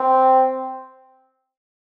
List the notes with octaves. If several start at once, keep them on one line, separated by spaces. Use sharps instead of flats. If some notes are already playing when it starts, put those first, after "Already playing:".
Already playing: C4